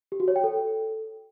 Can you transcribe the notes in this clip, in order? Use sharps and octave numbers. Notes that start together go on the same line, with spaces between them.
G4
F#4
C#5
G5
A4